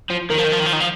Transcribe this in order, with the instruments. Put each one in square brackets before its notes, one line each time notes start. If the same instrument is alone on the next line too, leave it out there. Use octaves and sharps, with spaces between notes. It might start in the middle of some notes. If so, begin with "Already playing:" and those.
[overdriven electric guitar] F3
[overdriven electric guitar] D#3 [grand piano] A#4
[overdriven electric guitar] F3
D#3
F3
D#3
F3
D#3
F3